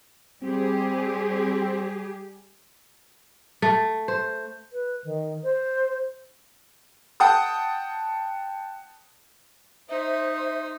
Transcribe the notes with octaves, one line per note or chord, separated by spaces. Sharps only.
G3 C4 G4 G#4
A3
C5
B4
D#3
C5
F#5 G5 A5 D#6
D#4 C5 E5